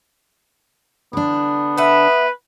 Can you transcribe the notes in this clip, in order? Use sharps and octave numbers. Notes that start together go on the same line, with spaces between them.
D3 B3 D4
B4 E5 F#5